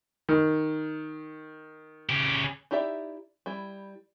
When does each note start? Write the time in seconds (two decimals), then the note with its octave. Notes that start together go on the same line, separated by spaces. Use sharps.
0.29 D#3
2.09 C#3 G4
2.71 D#4 E4 G4 D5 E5
3.46 G3 E4